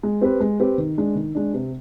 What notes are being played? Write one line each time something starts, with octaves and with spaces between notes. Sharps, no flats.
G#3
C4 G4 B4
G#3
C4 G4 B4
D#3
G#3 D4
D#3
G#3 D4
C3